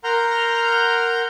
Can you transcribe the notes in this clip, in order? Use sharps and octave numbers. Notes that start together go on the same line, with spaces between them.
A#4 F#5 A#5 C6 F6 G6